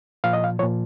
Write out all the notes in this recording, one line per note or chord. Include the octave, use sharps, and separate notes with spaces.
A#2 F3 F5
D#5
F5
A#2 F3 C#5